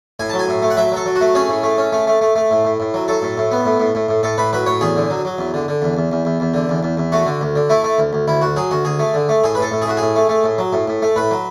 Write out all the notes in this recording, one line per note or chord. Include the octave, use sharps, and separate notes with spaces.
A2 G#5
F#3 A5
G#5
A2
A3
F#5
F#3 E5
F#3 A4
F#3
F#4
A3
C#4 G#4
A2
A3
C#4
A3
A3
A3
A3
A2
A2
A2
F#3
F#3 A4
A2
A2
B3
A2
A2
A2
A2
A2 A4
A2 B4
F#3 B4
A2 C#5
E2 G#4
D3
F#3
F#3
E2
D3
D3
E2
E2
E2
E2
E2
D3
E2
E2
E2
A3 F#4
D3
D2
D3
A3 E4
A3
D2
D2
D2 E4
D2 F#4
F#3 G#4
D2 F#4
D2 G#4
A3
D3
A3
A2 G#4
B4
A2 A4
A2
G#4
A2 F#4
A2 G#4
A3
A3
A2
F#3
A2
A2
A3
A2 B4
F#3